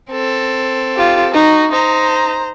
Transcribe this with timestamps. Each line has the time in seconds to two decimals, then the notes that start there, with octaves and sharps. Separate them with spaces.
0.10 C4 A4
0.96 F4 G4
1.34 D#4 F#4
1.71 D#4 C5 A#5